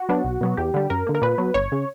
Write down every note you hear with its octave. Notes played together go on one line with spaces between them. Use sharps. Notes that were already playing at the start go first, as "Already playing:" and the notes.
Already playing: F#4
F#3 B3 D4
B1
B2 F#3 B3
E2 G4
D3 G3
F#2 A#4
D3 A#3
A#4
A#2 B4
F#3 B3
G1 C#5
C#3